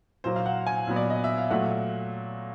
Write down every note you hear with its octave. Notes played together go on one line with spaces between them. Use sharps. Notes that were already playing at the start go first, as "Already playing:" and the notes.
A#2 F#3 A#3 C5
F5
F#5
G#5
A#2 F#3 B3
D5
D#5
E5
F5
A#2 F#3 A3 F#5